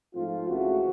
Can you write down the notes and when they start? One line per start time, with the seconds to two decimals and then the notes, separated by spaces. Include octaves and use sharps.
0.13 G#2 F3 A3 C4 F4
0.48 C#2 C#3 E3 A3 C4 F#4